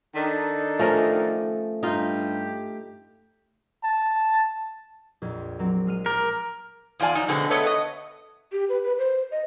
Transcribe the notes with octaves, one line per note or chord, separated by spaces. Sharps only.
D#3 D4 D#4 A4
F3 A3 C#4 A#4
G2 D#4 F4 G4
A5
A#1 F2 G#6
F#3 A#3 C4
G#3 F6 D#7
A#4 D6 G6 A6
E2 F3 F4 D5 G#5
F3 F#3 D#4
B2 D3 G#3 C4
A3 B3 A4 B4 C#5 D#5
D#5
G4
B4
B4
C5
D#5